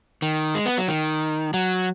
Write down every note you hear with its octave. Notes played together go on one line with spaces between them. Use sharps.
D#3
G#3
B3
F#3
D#3
F#3